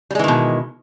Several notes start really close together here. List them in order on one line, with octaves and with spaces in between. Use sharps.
G3 G#3 E3 D#3 B2